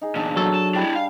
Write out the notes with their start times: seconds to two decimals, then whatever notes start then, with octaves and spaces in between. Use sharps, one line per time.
0.01 D#4 G#4
0.15 E2 A#2 D4
0.36 F#3 A4
0.54 A5
0.75 G3 D4 E4 G5 B5
0.95 F5